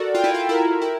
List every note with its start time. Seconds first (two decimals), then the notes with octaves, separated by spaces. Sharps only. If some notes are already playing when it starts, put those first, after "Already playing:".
Already playing: F#4 A4 A#4 D5
0.15 F4 G5
0.24 E4
0.34 F4
0.49 E4 A#4
0.82 E4 G5